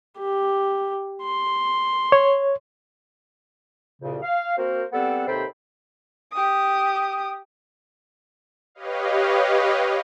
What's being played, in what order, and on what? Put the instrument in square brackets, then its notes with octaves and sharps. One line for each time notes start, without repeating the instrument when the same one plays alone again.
[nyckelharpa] G4
C6
[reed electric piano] C#5
[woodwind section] C2 F2 A#2 C#3
F5
A#3 C4 F#4 A#4 C5
G3 B3 C4 A4 F#5
D#2 C3 A4 C5 G5 B5
[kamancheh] G4 D#6
[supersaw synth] G4 B4 C#5 D#5 F5